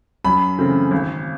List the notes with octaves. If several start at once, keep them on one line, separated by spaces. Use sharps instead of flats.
F#2 B5
C#3 E3 A3 C4
G#1